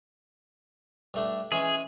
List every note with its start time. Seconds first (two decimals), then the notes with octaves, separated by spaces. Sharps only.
1.14 G2 A3 D4
1.52 E3 G#3 C#4 G#4